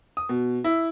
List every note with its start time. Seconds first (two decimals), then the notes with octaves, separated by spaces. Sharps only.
0.17 D#6
0.29 B2
0.64 E4